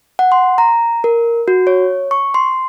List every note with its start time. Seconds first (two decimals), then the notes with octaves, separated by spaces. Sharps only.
0.19 F#5
0.32 C6
0.58 A#5
1.04 A#4
1.48 F#4
1.67 C#5
2.11 C#6
2.34 C6